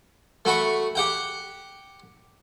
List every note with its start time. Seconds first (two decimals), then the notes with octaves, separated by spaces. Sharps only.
0.45 A3 F#4 B5 C#6
0.95 G4 F#5 G5